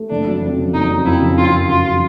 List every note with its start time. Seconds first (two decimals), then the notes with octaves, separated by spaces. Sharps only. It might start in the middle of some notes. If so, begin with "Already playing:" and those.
Already playing: A3
0.10 F#1 D4
0.26 F#3
0.42 F2
0.58 C#3
0.74 F#1 D#4
0.90 F#3
1.05 F2 E4
1.22 C#3
1.37 F#2 F4
1.53 F#2
1.69 C#3 F4
1.85 F#3